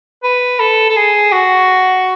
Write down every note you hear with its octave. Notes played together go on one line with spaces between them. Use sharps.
B4
A4
A4
G#4
F#4